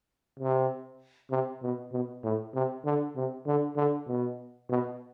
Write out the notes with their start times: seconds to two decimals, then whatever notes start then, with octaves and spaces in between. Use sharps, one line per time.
0.39 C3
1.31 C3
1.63 B2
1.92 B2
2.23 A2
2.55 C3
2.85 D3
3.16 C3
3.46 D3
3.76 D3
4.07 B2
4.69 B2